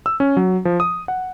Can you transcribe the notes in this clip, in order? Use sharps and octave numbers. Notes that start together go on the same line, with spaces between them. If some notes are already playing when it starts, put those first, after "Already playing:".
E6
C#4
F#3
F3
D#6
F#5